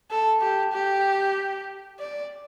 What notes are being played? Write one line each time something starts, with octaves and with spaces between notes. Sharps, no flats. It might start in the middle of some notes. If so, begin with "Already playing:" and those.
A4
G4
G4
D5